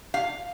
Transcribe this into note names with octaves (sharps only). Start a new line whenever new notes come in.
F5